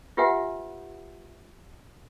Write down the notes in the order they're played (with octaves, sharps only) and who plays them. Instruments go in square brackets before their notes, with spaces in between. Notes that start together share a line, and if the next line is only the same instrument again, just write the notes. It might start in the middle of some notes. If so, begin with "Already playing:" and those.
[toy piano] F4 G4 B4 E5 F#5 G#5